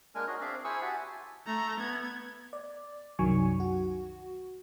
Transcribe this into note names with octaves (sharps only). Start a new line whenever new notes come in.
G#3 A#3 D4 A#4 G#5 F6
D4 D#4 F#4 G#4 C#5 D#5
C4 D4 G#4 D5 E5 F5
E4 G#4 C5 G#5 C#6 E6
F#4 G4 E5 F#5 G#5 A5
A3 A#5
B3 G#6
D5
C2 F#2 D#3 F#3 G#5 C#6
F#4